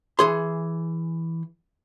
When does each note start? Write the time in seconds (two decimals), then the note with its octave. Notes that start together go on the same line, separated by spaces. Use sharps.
0.19 E3 G#4 C6